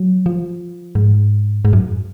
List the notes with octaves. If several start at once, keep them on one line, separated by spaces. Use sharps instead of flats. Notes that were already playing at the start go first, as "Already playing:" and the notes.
Already playing: F#3
F3
G#2
G#2
F#2